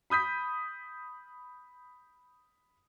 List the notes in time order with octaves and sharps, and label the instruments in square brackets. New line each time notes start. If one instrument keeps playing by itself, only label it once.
[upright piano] B5 D#6 G6 B6